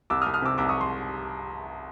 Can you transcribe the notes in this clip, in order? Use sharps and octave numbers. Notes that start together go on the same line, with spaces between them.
C2 D6 E6
D#6 F6
C2
D#6 F6
C3 D6 E6
C2 D6 E6
C#6 D#6
C6